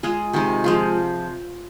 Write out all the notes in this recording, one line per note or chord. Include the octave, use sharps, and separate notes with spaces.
G#3 F4 G#4
C3 D#3 G#3
F3 G#3 F4